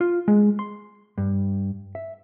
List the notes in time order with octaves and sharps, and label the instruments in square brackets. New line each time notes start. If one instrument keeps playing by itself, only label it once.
[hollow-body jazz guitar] F4
G#3
C6
G2
E5